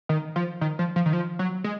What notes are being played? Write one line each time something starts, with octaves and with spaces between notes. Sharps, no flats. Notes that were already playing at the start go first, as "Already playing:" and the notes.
D#3
F3
D#3
F3
F3
D#3
F3
F#3
G#3